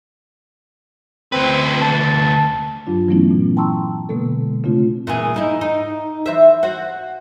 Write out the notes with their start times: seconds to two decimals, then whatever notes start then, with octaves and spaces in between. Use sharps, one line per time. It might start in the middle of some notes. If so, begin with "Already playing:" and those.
1.32 D2 C4 B4
1.82 A5
2.87 G2 F#3 D4 F4
3.08 E3 F#3 A3 B3 C#4 E4
3.31 A#2
3.57 G5 A5 A#5 C6 C#6 E6
4.09 B2 D3 G#3 A#3 B3 A4
4.64 C#3 A3 C4 D4 E4 F4
5.07 A#2 E3 G#4
5.34 G#2 D#4 E4
5.61 D#4
6.26 E3 C5 E5
6.63 F#4 C5